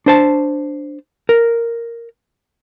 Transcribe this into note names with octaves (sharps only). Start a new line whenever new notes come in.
D4 C5 A5
A#4